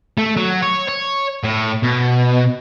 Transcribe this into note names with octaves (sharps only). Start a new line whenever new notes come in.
A3
F#3
C#5
C#5
A2
B2